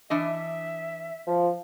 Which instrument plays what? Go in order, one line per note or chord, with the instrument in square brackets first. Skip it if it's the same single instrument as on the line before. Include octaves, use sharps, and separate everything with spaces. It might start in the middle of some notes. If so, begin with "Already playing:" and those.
[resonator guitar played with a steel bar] E3 D4 D#5 [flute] E5
[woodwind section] F3